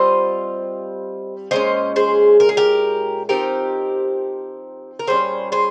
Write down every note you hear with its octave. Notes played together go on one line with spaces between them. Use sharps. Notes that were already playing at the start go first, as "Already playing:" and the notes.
Already playing: G3 C4 F4 C5 D#5
A#2 G#3 C#4 C5 D#5
G#4 C5
A#4
G#4
G4 A#4
F3 C4 D#4 G4 A#4
A#4
A#2 G3 C#4 G#4 C5
G#4 C5